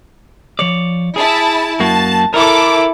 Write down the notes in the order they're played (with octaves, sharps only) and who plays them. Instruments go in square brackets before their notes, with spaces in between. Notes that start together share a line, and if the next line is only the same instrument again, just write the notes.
[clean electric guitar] F3 C#5 D5
[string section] E4 A5 [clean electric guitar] G#4
[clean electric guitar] F#2 A#3 F#4 [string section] A5
[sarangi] E4 [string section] A4 D6 [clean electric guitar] A#4